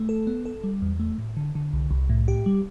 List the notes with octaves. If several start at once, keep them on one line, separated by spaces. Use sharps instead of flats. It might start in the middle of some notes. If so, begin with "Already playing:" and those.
Already playing: A3
A4
B3
A4
G3
E2
A3
A2
D3
D3
C2
C2
A2
G4
G3